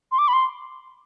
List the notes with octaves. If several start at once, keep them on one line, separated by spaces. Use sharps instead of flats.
C6
D6
B5
C6